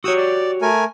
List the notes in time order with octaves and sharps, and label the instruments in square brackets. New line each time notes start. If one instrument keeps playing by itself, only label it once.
[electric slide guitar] F#4 G4 C#5 [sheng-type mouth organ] D#6 E6
[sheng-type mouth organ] D5
A3 A#4 G#5